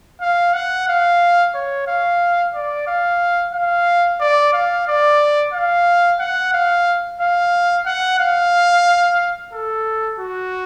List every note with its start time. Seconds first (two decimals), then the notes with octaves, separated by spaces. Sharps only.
0.21 F5
0.54 F#5
0.88 F5
1.55 C#5
1.87 F5
2.55 D5
2.87 F5
3.53 F5
4.20 D5
4.53 F5
4.88 D5
5.54 F5
6.20 F#5
6.53 F5
7.20 F5
7.86 F#5
8.19 F5
9.53 A4
10.19 F#4